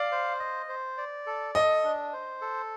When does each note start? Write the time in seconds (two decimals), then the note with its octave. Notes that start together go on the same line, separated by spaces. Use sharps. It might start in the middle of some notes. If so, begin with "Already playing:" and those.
Already playing: D5 F5
0.12 C5
0.40 D#5
0.69 C5
0.98 D5
1.26 A4
1.55 A4 D#5
1.84 D4
2.13 C5
2.41 A4